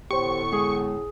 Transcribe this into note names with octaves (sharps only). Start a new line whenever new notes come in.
A2 D3 B3 G4 C5 C#6
G#3 G#4